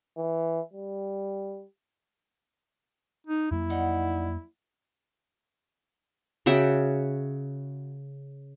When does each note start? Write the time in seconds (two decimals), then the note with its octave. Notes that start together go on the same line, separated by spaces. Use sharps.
0.17 E3
0.73 G3
3.27 D#4
3.51 F2 F#3 A#3 E4
3.70 G3 D#4 F#5
6.46 C#3 F#4 E5 G5